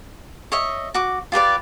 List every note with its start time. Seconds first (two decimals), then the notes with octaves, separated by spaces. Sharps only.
0.52 C#5 D#5 E5
0.94 F#4 D6
1.32 F4 G4 B4 D5